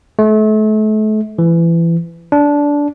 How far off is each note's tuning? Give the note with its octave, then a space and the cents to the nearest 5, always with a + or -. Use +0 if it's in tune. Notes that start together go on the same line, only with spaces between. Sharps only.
A3 -35
E3 +25
D4 -15